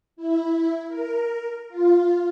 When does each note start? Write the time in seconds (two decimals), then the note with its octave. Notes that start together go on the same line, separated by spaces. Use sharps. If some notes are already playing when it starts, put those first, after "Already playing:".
0.16 E4
0.88 A#4
1.69 F4